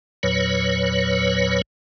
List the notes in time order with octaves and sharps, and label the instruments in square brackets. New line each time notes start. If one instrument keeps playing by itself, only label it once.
[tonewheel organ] E2 A#2 F#3 B4 C#5